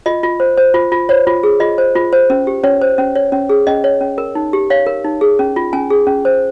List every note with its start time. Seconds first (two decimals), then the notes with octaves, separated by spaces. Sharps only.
0.06 F4 D#5
0.23 F4
0.40 C5
0.58 C5
0.74 F4
0.92 F4
1.09 C5 C#5
1.27 F4
1.43 G#4
1.60 F4 D#5
1.78 C5
1.95 F4
2.13 C5
2.30 C#4
2.47 G4
2.64 C#4 C#5
2.81 C5
2.98 C#4
3.15 C#5
3.32 C#4
3.49 G#4
3.67 C#4 D#5
3.84 C#5
4.01 C#4
4.18 A#4
4.35 D#4
4.53 G4
4.70 C#5 F5
4.86 A#4
5.05 D#4
5.21 G#4
5.39 C#4
5.56 F4
5.73 C#4 G#5
5.90 G#4
6.07 C#4
6.25 C5